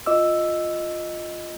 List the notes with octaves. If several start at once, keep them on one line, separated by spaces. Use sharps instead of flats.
F4 D#5 D6 E6